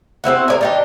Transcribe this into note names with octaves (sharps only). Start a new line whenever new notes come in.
C3 C4 E4 F#4
A#4 D5 G#5
D4 D#4 G4